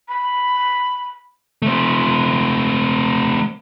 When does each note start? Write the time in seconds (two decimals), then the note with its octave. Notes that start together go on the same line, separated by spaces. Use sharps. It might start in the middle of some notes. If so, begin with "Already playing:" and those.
0.09 B5
1.62 A3 C4